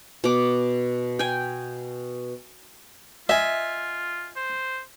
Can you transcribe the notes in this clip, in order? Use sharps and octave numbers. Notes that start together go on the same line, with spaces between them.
B2 D6
G5 G#5
F4 D#5 E5 G#5
C5